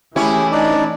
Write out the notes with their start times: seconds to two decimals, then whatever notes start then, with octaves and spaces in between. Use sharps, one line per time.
0.16 E3 A3 C#4 E4 G4 G#4 C#5
0.52 D4 D#4 D5